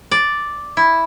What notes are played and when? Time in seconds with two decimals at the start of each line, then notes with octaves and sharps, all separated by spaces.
0.11 D5
0.77 E4